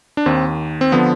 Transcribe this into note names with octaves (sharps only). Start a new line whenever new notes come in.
D4
D#2 D#3 C4
C4
D3 F3 B3